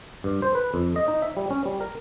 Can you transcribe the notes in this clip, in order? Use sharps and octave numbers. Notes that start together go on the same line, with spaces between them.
G2
C5
B4
F2
D#5
D#4
E5
G3
C#4
G3
A#4